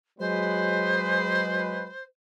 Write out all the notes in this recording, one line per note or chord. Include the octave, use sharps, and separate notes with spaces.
F#3 G#3 B4 C5